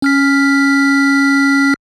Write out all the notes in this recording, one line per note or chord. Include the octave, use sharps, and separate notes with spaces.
C#4 F6 B6